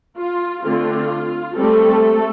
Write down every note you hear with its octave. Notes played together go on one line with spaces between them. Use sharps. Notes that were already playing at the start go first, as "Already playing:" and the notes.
F4
D3 A3 C4 F4
G3 A3 C4 A4